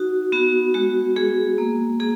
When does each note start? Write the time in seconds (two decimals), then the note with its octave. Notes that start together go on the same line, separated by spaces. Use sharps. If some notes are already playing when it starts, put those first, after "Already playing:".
Already playing: D#4 F#4
0.32 B3 F#4
0.74 G#3 F#4
1.16 G#3 G#4
1.58 A#3
2.00 A#3 G#4